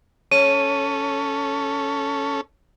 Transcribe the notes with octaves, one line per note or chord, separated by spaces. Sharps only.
C#4 A4 C#5 D#7